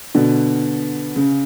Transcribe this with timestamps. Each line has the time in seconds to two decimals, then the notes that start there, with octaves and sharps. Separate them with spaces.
0.15 B2 D3
1.16 C#3